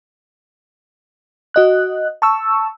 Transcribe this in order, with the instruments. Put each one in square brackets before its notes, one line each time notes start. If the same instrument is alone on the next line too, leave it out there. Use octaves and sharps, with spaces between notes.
[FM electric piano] F#4 D#5 F#6
A5 C#6 E6